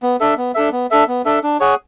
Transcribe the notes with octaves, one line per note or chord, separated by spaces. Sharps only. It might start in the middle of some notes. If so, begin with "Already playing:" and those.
B3
D4 A4 E5
B3
D4 A4 E5
B3
D4 A4 E5
B3
D4 A4 E5
D4
G#4 C#5 F#5